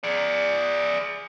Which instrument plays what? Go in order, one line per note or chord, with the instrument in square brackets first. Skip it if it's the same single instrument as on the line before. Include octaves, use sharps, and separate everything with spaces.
[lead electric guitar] G#4 D5